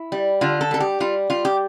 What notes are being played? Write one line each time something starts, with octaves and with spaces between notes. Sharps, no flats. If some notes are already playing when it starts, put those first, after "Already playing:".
Already playing: E4
G3
D3 F4
A4
G3 A4
G4
G3 F4
G3 F4
G4